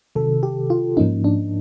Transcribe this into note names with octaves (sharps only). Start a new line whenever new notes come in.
C3 D#3 F#3 A4
G4
F4
G#2 F3 A#3 C#4 D#4
D4